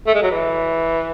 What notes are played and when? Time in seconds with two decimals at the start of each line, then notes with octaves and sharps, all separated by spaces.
0.07 A3
0.14 G#3
0.23 F#3
0.31 E3